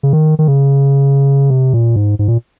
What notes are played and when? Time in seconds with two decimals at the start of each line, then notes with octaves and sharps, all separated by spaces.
0.03 C#3
0.13 D#3
0.39 D#3
0.48 C#3
1.50 C3
1.73 A#2
1.96 G#2
2.19 G#2
2.28 A#2